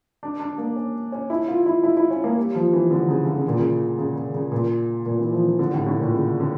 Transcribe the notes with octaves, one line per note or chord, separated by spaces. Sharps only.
D4
D4
A#3
C#4
C#4
E4
F4
E4
E4
E4
C#4
A#3
G3
F3
E3
D3
C#3
D3
C#3
A#2
C#3
C#3
C#3
C#3
A#2
A#2
E3
F3
E3
D3
A2
A2
A#2
C#3
D3